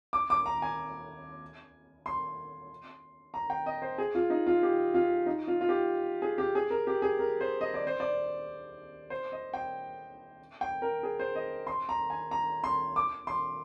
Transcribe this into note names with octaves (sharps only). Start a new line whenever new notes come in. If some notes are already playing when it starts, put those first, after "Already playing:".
D6
D6
A#5
G#5
C6
A#5
G5
D#5
C5
G#4
F4
D#4
F4
G4
F4
D#4
F4
F4
G4
G#4
G4
G#4
A#4
G4
G#4
A#4
C5
D#5
D5
C5
D5
C5
D#5
G5
G5
A#4
G#4
C5
D#5
C6
A#5
G#5
A#5
C6
D6
C6